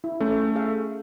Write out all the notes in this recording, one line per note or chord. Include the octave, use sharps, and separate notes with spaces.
E4
A3 C#4
G#4 E5 F5